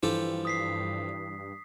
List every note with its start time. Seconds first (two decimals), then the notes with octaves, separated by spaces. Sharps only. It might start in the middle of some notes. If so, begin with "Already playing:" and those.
0.03 G2 E3 F3 G4 A4
0.45 D#6 B6 C7